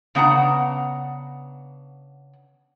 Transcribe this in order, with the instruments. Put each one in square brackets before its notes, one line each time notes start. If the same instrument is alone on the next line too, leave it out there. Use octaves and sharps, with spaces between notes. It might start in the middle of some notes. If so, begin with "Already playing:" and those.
[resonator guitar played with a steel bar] C#3 B3 D4 F#5 A#5